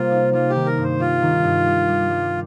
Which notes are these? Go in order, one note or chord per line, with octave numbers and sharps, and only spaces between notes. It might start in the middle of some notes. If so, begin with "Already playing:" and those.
Already playing: C3 G3 A#3 F4
D#4
G3 F4
G4
D#3
A#4
G2
C5
G3 F4
D#3
G2
G3
G3
G3